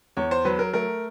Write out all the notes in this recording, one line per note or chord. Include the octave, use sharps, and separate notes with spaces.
E2 C#5
C5
F#3 B4
A#4
A3 A#4